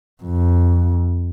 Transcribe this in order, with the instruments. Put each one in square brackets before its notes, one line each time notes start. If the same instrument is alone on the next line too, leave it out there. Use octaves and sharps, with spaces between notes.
[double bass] F2